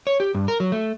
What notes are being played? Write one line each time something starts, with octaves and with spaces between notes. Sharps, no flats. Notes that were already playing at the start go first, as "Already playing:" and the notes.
C#5
G4
G2
A#4
F#3
A3